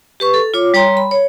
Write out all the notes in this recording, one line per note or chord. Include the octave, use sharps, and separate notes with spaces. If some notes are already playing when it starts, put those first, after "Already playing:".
G4 B4 C#6
A4
F4 C#5 D6
G3 C#5 G5 A#5 C6
B5
C#5